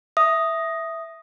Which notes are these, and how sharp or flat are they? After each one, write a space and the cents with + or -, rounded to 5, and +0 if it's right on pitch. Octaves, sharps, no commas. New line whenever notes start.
E5 +0 D#6 +0